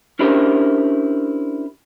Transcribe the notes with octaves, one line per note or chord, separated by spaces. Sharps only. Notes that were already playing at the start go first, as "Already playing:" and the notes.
C#4 D4 E4 G4 A#4 C5